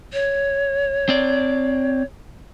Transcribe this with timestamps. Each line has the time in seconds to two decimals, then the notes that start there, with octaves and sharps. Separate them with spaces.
0.13 C#5
1.09 C4 D5